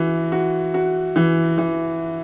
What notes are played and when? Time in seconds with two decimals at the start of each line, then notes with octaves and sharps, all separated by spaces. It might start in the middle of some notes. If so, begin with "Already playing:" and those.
Already playing: E3 F#4
0.32 F#4
0.74 F#4
1.16 E3
1.58 E3